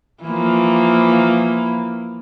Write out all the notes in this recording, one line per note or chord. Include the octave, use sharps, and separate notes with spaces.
E3 F3 A#3